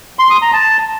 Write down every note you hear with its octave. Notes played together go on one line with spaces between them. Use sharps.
C6
D#6
A#5
A5